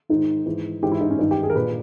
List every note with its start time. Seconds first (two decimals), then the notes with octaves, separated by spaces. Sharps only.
0.09 G#2 D#3 D#4
0.46 G#2 E3
0.83 G#2 E3 G4
0.92 E4
1.01 D#4
1.10 C#4
1.19 G2 D#3 D#4
1.31 G4
1.43 G#4
1.50 A#4
1.55 A#2 B4